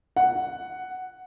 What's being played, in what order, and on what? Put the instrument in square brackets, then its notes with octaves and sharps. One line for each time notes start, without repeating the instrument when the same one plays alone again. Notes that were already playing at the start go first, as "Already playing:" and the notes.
[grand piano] F#5